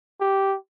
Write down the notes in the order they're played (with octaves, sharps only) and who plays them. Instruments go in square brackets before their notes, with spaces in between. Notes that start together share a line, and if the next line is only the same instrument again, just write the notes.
[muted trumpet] G4